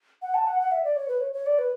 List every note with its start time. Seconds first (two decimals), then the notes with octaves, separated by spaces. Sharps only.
0.22 F#5
0.34 A5
0.47 F#5
0.60 F#5
0.72 E5
0.84 D5
0.96 C#5
1.08 B4
1.21 C#5
1.33 C#5
1.46 D5
1.59 B4